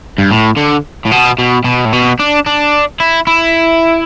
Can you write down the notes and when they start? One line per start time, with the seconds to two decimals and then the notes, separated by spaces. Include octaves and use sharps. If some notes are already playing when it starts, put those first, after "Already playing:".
0.18 G2
0.31 A2
0.56 D3
1.05 A2
1.11 B2
1.38 B2
1.64 B2
1.85 A2
1.92 B2
2.19 D4
2.46 D4
3.00 E4
3.27 E4